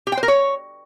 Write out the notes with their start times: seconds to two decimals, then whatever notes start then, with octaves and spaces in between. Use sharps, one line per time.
0.07 G4
0.12 G5
0.17 C5
0.23 A#4
0.28 C#5